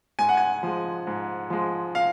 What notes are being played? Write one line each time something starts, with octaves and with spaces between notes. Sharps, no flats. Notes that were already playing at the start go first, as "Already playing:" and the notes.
G#2 G#5
F#5
G#5
F3 G#3
G#2
F3 G#3
F5